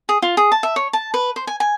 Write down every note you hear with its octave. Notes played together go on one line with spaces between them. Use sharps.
G#4
F4
G#4
A5
E5
C#5
A5
B4
C5
G#5
G#5